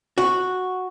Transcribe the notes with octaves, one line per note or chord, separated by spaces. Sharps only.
F#4